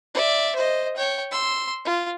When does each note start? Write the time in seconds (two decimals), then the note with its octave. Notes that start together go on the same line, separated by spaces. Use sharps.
0.14 D5 E5
0.56 C5 D#5
0.96 C#5 G5
1.31 C6 E6
1.85 F4